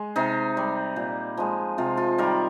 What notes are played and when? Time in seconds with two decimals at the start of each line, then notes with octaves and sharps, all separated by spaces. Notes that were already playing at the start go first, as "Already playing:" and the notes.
Already playing: G#3
0.16 C3 D#4
0.57 G3
0.96 A#2
1.37 F3 G#3
1.78 C3 F4
1.97 F4
2.18 D#3 G3 A#4